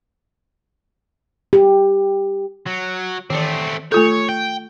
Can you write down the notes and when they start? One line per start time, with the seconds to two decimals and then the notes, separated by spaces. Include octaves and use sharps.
1.53 G4
2.66 F#3
3.30 D#3 E3 A3 C4
3.92 A3 F4 A4 C#5
4.29 G5